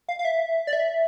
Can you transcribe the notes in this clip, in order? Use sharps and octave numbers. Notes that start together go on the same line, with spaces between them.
F5
F5
E5
D5
E5